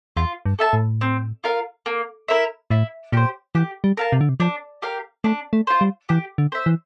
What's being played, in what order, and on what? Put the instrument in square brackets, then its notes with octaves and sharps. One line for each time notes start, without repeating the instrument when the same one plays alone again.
[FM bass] E2 [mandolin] F4
[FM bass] G2
[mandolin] A4 E5 A5
[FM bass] A2
[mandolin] C4
F4 A#4 F5
A#3
E4 A#4 E5
[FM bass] A2 [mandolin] E4
[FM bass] A#2 [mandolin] G4 C5
[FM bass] E3 [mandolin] G4
[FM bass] G3
[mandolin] A#4 F5 A5
[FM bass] C3
D3
C3
[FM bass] F3 [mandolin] D4
[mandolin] G4 A#4 F5
[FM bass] A3 [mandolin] D4
[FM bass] A3
[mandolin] F4 C5
[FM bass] G3
[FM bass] E3 [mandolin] G4
[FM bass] D3
[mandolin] C5 E5
[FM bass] E3